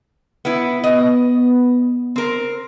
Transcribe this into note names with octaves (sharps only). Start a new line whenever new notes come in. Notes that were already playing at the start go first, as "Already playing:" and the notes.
B3 E4
B3 D#5
C4 A#4